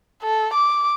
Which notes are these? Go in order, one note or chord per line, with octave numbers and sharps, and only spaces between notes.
A4
D6